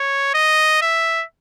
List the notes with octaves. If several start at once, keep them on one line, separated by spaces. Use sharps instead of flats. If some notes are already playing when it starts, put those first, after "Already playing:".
Already playing: C#5
D#5
E5